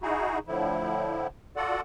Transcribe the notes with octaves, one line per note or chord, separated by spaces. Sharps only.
D#4 E4 F#4 G#4
A2 D3 F3 E4
F4 F#4 A4 D5 F#5